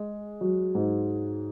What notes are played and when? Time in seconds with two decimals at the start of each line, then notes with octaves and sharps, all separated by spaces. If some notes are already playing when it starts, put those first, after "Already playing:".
Already playing: G#3 G#4
0.41 F#3 F#4
0.75 G#2 G#3